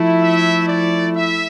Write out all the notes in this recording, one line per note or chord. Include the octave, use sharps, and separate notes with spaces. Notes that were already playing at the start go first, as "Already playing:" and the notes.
Already playing: F3 A3 E4
E5
D5
E5